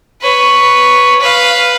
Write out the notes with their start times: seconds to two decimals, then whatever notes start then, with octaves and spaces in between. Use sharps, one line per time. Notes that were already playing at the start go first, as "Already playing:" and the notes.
0.21 B4 C#5
1.20 B4 F5